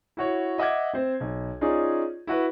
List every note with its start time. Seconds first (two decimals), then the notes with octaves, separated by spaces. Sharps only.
0.17 E4 F#4 C#5
0.58 D#5 E5 F#5 D6 G#6
0.93 C4 C5
1.20 B1
1.61 C#4 D#4 F4 G#4 D5
2.27 E4 F#4 B4